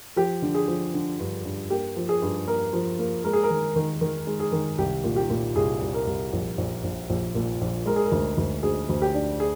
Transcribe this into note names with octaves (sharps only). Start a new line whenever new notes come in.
F3 G4
D3
G#4
F3
D3
G2
G2
A#3 G4
F3
G#4
G2
A#3 A#4
F3
A#3
G#3 A#4
G#4
A#4
D#3
D#3
D#3
G#3
G#4
D#3
C2 G4
A#2
G4
A#2
C2 G#4
C2
A#4
C2
A#1
A#1
A#1
A#1
A#2
A#1
G#3 A#4
G#4
A#4
D2
D2
D2 G#4
D2
G4
D4
G#4